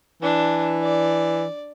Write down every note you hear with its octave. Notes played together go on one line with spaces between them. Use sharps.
E3 D4
D5